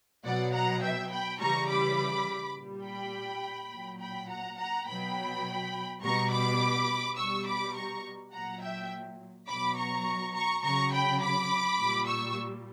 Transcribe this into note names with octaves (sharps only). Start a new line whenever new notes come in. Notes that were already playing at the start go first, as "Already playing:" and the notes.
B2 F#3 D5 F#5
F#5 A#5
E5 G5
G5 B5
C#3 E3 G3 A#5 C#6
B5 D6
A#2 G3
G5 B5
A#2 F#3
G5 B5
F#5 A#5
F#5 A#5
B2 F#3 G5 B5
B2 G3 A#5 C#6
B5 D6
B2 G3 C#6 E6
B5 D6
A#5 C#6
A#2 F#3 F#5 A#5
E5 G5
B2 F#3 B5 D6
A#5 C#6
A#5 C#6
C#3 F#3 A#5 C#6
G5 B5
B5 D6
A#2 G3
C#6 E6